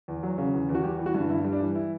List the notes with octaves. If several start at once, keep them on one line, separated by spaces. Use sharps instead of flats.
E2
F#3
C#3
E2
E2
F#4
G3 G4
E3
F#4
G2
G2 E4
G3
D4
E3
E4